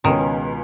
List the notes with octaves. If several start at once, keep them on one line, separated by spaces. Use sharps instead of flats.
C#2 B2 D#3 G#3 C#4 G#4